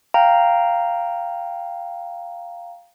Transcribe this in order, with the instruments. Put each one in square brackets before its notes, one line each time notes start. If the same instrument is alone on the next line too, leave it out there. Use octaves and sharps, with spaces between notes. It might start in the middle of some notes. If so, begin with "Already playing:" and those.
[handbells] F5 G5 A#5